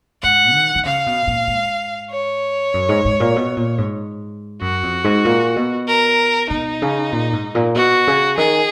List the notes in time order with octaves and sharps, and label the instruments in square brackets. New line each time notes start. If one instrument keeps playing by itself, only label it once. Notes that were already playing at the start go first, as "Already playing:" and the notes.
[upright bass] G#2 [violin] F#5
[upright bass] D#3
D#3
[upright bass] C#3 [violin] F5
[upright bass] B2
A#2
G#2
[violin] C#5
[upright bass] F#2
G#2
G#2
A#2
B2
A#2
G#2
[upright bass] F#2 [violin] F#4
[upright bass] F2
G#2
A#2
B2
[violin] A#4
[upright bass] B2 [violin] D#4
[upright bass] C#3
A#2
G#2
A#2
[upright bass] B2 [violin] F#4
[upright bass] C#3
[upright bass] D#3 [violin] G#4